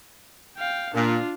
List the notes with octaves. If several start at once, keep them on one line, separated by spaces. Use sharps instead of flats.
F5 G5
A#2 D4 F4